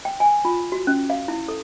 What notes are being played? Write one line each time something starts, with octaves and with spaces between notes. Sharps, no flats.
G5
G#5
F4
F#4
C#4
F5
E4
A4